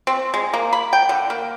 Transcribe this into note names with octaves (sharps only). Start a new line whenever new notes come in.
C4
G#3
A#3
B5
G5
D3
A#3